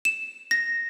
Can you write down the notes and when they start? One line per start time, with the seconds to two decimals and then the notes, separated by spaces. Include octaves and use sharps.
0.05 E7
0.51 A#6